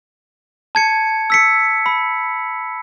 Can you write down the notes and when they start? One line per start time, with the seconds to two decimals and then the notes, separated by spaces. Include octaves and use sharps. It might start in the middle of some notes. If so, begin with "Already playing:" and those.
0.75 A5 G#6 C#7
1.30 E6 B6 C#7
1.86 B5